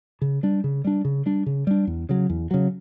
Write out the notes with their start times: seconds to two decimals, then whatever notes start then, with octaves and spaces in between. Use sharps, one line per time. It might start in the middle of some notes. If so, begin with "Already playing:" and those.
0.21 C#3
0.43 G3 D4
0.64 C#3
0.85 G3 D4
1.05 C#3
1.26 G3 D4
1.46 C#3
1.67 G3 D4
1.87 E2
2.09 C#3 F#3
2.30 E2
2.51 C#3 F#3